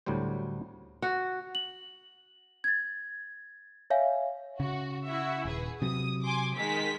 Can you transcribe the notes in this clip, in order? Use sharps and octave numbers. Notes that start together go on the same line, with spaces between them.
D2 A2 F#3 G3 C5
F#4
F#7
G#6 A6
C#5 E5 F5 G#5
C#3 F#4
E4 F#4 E5
D#1 G#4 B4
C3 F#3 D#6
G#5 C6 D6
D#3 G#3 B6